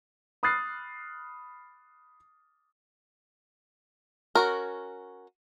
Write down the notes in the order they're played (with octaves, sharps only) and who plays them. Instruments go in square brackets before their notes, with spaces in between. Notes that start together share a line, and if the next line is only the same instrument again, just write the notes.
[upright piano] B5 D#6 F6 F#6 A6 C7
[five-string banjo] C#4 F#4 A#4